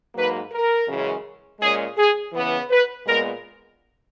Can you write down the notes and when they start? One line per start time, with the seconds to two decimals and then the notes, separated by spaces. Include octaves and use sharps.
0.14 G#2 F#3 A#3 B4
0.51 A#4
0.87 F#2 C#3 E3 G#3 C#4
1.60 A#2 G#3 C#4 G#4
1.97 G#4
2.33 C#3 E3 B3
2.70 B4
3.05 A#2 G#3 B3 A#4